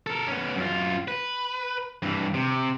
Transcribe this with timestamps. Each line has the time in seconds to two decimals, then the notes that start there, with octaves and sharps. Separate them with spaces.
0.07 A4 A#4
0.28 B3 C#4
0.56 F#2 F4
1.08 B4
2.03 G2 E3
2.34 C3